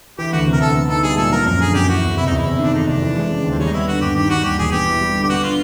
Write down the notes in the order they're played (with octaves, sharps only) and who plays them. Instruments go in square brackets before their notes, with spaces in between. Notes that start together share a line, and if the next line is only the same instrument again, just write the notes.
[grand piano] E3 [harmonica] G4
[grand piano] D2 [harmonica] F#4
[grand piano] C3
[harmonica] A#4
[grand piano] D2 [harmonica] A4
[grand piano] B3
[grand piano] D#4 [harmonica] A4
[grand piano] G3 [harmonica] G#4
[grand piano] A#2 [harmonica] A4
[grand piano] F3 [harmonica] A#4
[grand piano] F#2 [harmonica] A#4
[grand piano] D3 [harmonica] G#4
[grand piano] F#2 [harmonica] G4
[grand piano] E3 [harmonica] F#4
[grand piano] E2
[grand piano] C3 [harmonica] E4
[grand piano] E2 [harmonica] D#4
[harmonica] E4
[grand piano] C3
[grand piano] D#3 [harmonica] D4
[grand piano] F2 [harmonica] D#4
[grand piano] F1 [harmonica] D4
[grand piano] E3
G#3
C#3
D#2
[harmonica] C4
[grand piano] G3 [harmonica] C#4
[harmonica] D#4
[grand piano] B3 [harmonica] E4
[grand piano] D3 [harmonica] F#4
[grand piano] G2 [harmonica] G4
[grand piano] D#3 [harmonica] G4
[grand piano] G3 [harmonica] F#4
[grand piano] D#2 [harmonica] G4
[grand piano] E1 [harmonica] G#4
[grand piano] B3 [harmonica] G4
[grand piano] E4
G3
D3
[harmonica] G4
[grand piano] B3 [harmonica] F#4
[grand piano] D4 [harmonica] F4